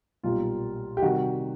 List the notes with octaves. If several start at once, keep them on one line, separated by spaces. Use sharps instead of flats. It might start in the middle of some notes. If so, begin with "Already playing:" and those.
B1 A#2 G3 A#3 F4
G4
C3 D#3 G3 F#4